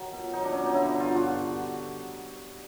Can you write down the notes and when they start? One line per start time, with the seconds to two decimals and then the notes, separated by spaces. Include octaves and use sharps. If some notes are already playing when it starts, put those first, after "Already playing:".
Already playing: D#3 F#3
0.12 B2
0.33 F#3 D#4
0.44 D4
0.53 B2 C#4
0.66 D#4
0.73 D3 E4
0.87 D#4
0.94 G2
1.00 F4
1.14 G2 F#4